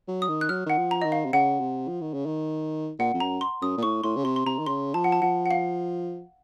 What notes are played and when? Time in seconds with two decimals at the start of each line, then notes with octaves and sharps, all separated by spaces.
0.08 F#3
0.22 D#6
0.29 D#3
0.41 F#6
0.49 F#3 F6
0.66 D#3 F#5
0.78 F3
0.91 A#5
1.02 D#3 D#5
1.12 F5
1.25 C3
1.33 C#3 F#5
1.60 C3
1.88 F3
2.01 D#3
2.14 C#3
2.26 D#3
2.99 A#2 F#5
3.14 F2
3.20 F#2 A#5
3.41 C6
3.62 F#2 D#6
3.77 A#2
3.83 A2 C#6
4.04 A2 C6
4.16 C#3
4.25 C3 C6
4.36 C6
4.46 C3 A#5
4.59 D#3
4.66 C#3 C6
4.94 F3 A5
5.04 F#5
5.12 A5
5.22 F3 F#5
5.46 F#5
5.51 F5